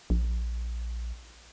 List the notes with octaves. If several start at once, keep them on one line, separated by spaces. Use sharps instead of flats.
A#1